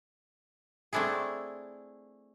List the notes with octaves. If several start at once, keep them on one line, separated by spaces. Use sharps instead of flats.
A3 C4 D4 E4 G#4